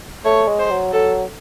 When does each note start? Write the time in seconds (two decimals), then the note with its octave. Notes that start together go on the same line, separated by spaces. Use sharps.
0.25 A3 C#5
0.48 G#3
0.59 C5
0.70 F#3
0.93 F#3 A4